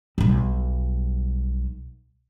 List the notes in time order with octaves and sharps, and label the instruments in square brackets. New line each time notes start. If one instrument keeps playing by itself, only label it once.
[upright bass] B1 G3